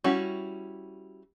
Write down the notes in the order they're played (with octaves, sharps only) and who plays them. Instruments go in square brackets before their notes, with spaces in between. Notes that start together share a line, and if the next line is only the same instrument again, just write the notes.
[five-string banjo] G3 C#4 E4 F#4